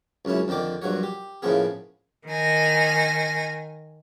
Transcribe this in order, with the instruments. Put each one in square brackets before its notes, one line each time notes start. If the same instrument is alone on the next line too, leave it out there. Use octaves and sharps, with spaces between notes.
[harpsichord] C#2 F#2 C#4 E4
F2 D3 D#3 G5 D6
A#1 G2 F#3 F#4 C#5
G4
A2 C#3 F3 A#3 B3 G#4
[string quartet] D#3 G#5 A#6